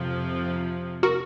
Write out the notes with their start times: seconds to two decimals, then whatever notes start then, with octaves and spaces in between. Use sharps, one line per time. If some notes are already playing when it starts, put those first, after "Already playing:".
Already playing: F2 C3 F3
1.03 F#4 A#4